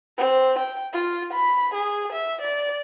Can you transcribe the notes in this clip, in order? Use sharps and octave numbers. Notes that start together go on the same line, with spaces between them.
C4
G5
F4
B5
G#4
E5
D5